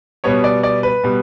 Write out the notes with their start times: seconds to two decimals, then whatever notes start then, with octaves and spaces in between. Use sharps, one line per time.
0.24 B2 G3 B3 C#5
0.44 D5
0.63 D5
0.83 B4
1.04 B2 G3